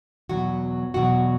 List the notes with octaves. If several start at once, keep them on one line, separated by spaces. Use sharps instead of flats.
E2 B2 F#3 F#4
E2 B2 F#3 F#4